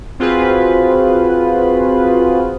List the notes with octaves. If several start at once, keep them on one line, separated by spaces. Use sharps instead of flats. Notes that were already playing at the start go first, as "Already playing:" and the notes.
C4 F4 F#4 G#4 B4 C5